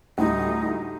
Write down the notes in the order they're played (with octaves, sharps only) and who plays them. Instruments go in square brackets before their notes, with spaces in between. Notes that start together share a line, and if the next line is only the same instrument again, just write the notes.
[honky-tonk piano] D2 A2 G3 [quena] D#4